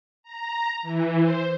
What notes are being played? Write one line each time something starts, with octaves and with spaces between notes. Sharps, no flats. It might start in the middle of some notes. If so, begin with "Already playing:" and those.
A#5
E3
C5